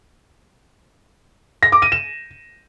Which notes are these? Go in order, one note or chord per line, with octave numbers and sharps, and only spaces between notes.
A#6
D6
D#7
E7